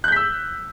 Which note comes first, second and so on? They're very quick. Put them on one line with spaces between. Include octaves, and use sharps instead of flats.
F#6 G6 B6 E6